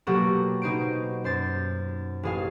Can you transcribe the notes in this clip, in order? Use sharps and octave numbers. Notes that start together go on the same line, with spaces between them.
B2 F#3 A#3 F#4 G4 A4
B2 D#4 C5 D7
F#2 C5 A6
A1 G#4 F5